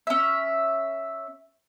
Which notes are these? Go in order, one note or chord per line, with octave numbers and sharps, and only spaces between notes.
C#4 E5